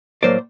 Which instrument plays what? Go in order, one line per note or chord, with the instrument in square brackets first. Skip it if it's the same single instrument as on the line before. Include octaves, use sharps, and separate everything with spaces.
[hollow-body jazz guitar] A2 F#3 A#3 C5 D5